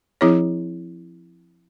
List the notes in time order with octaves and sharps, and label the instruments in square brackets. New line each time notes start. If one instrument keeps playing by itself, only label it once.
[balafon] F3 C4 E4 G#4 C#5